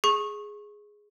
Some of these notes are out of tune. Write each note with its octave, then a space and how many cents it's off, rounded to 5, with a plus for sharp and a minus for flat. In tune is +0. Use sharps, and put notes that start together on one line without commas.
G#4 +0 C#6 -25